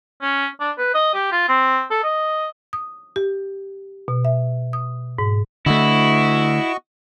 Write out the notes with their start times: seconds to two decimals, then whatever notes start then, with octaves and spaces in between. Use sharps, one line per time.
0.22 C#4
0.60 D4
0.78 B4
0.94 D#5
1.14 G4
1.32 F4
1.48 C4
1.91 A4
2.04 D#5
2.73 D#6
3.16 G4
4.08 B2
4.25 E5
4.73 D#6
5.18 G#2
5.66 D3 A3 E4 F#4 D#5 C#6